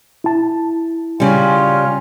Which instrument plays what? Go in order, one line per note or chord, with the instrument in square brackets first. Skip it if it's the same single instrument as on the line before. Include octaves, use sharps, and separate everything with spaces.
[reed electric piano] E4 A5
[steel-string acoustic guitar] C#3 G3 [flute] C#4 [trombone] F4